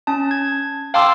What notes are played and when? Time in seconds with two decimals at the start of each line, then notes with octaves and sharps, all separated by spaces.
0.07 C#4 A5
0.31 G#6
0.94 F5 G5 A5 C6 D6 E6